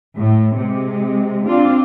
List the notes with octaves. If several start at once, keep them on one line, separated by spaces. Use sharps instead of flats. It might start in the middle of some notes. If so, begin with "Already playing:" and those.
A2
C3 G#3
C4 D4 F4